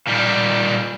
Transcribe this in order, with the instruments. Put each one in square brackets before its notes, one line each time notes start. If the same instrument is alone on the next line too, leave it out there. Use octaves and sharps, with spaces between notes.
[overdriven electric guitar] A#2 G3